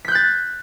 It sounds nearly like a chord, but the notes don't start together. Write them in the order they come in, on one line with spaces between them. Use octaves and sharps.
B6 G6 F#6 A6